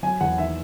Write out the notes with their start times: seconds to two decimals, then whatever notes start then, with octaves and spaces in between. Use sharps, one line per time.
0.03 F#3 G#5
0.21 E2 F#5
0.37 D#2 E5